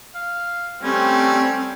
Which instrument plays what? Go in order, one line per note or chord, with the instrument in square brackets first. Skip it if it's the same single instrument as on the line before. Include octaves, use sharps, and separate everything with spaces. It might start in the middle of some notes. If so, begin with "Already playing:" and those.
[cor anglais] F5
[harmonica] G3 A3 [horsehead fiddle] C4 [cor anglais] C#4